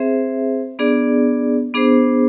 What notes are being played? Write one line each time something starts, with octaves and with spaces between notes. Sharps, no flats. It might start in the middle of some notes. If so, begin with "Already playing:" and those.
Already playing: C4 G#4 C5 E5
B3 D4 G#4 D5
B3 D4 G#4 C5